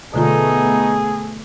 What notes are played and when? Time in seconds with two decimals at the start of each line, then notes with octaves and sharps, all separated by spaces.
0.14 B2 D3 A3 B3 D#4 F4 G#4